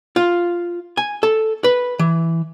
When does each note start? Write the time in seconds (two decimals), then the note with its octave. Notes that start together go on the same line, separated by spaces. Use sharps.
0.16 F4
0.97 G#5
1.23 A4
1.64 B4
1.99 E3